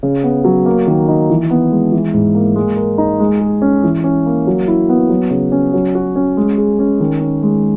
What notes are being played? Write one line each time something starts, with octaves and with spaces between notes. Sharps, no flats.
C#3
B3
F#3
A#3
D#3
D#4
E3
B3
G#3
E3
G#2
A#3
G#3
A#4
D#4
G#3
G#4
C#4
E3
C#4
A#3
F#3
E4
B3
F#3
C#3
C#4
F#3
F#4
C#4
G#3
G#4
C#4
D#3
C#4
G#3